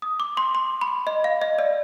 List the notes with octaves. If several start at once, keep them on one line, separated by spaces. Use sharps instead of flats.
D#6
D6
C6
C6
B5
D#5
F5
D#5
D5